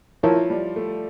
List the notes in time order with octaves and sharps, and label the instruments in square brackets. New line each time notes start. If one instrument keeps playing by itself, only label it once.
[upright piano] F3 [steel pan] E4 A#4 C#5 E5 A5
[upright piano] G3
A3